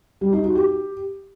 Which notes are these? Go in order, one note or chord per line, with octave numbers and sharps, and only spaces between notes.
G3
D#4
F#4
G4